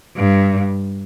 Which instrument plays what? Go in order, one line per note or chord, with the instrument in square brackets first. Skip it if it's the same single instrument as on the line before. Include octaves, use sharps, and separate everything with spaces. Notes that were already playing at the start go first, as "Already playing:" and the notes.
[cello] G2